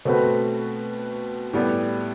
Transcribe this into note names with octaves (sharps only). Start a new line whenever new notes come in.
B2 A3 C4 F#4 B4
A2 G3 B3